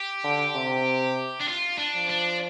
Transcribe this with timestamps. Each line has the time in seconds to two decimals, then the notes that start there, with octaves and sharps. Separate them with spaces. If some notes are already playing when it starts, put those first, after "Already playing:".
Already playing: G4
0.24 D3
0.55 C3
1.41 D4
1.49 F4
1.79 D4
1.95 F3
2.10 D4